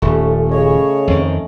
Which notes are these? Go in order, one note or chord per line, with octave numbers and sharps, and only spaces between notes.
D#1 A3 C#4 A4
C#3 C#5 D#5
F2 D#3